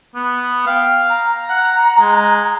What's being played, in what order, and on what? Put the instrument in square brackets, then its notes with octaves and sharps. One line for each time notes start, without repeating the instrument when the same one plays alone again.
[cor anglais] B3
[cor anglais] F5 [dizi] G5
[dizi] A#5
[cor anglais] F#5
G#3